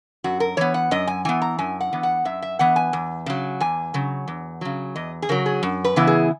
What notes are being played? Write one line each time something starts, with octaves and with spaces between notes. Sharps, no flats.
F#2 F#4
A#4
E3 B3 C#5
F#5
F#2 D#5
G#5
E3 B3 G#5
A#5
F#2 G#5
F#5
E3 B3
F#5
F#2 E5
E5
E3 B3 F#5
G#5
E2
C#3 F#3
E2 G#5
C#3 F#3
E2
C#3 F#3
E2 D#5
G#4
C#3 F#3 A#4
G#4
F#2
B4
C#3 E3 B3 E4
G#4